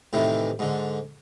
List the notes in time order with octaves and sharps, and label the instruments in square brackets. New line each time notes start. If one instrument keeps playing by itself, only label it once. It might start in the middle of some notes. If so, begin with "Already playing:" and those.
[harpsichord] A2 C3 D#3 E3
G#2 D3